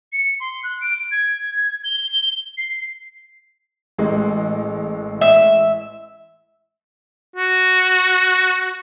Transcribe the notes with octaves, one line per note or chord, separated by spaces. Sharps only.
C#7
C6
F#6
D7
G#6
G7
C7
A1 G#3
E5
F#4